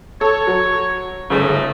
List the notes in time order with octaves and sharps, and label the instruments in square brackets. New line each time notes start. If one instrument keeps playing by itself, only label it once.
[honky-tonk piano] A4 [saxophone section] C#5
[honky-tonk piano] F#3
[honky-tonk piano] G1 C#3 [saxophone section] G#2 A3